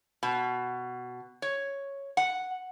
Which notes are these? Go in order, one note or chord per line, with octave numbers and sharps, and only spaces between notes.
B2
C#5
F#5